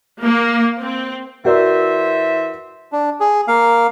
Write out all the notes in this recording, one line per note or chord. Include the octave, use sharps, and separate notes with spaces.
A#3
C4
E3 F#4 A#4 C5 D5 E5
D4
G#4
A#3 F5